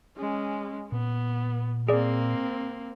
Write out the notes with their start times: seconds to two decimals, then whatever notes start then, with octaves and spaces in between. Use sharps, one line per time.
0.18 G#3 C#4
0.92 A#2 B3
1.88 A#3 C4 G#4 D5